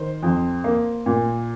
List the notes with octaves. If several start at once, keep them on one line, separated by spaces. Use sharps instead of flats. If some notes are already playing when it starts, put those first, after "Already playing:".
Already playing: D#3 C5
F2
A#3
A#2